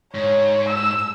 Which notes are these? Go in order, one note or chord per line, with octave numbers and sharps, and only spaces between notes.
G#2 C#5
E6